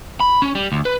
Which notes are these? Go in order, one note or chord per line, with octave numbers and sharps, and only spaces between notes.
B5
C#4
G3
D2
B4